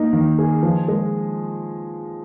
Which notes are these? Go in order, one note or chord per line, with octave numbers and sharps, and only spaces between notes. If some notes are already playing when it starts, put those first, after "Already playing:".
Already playing: A#3 D#4
D#3
G#4
F3
G#3